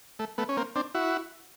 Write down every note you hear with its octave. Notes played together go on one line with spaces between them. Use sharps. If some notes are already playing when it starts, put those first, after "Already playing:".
A3
A3 B3
C#4
A#3 C4
C4 D4
E4 F#4